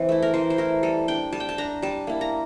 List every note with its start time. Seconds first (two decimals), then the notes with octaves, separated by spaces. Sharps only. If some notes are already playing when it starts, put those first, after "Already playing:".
Already playing: E3 C4
0.09 A3 E4
0.23 A#4
0.34 E3 C5
0.50 C5
0.58 A3 E4 A#4
0.83 G3 A4
1.08 D4 G5
1.33 G3 A5
1.40 G5
1.49 A5
1.58 D4 A#5
1.82 G3 A5
2.07 A#3 E4
2.21 A#5